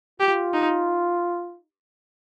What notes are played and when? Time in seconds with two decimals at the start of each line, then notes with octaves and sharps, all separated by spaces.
0.20 F4 G4
0.54 D#4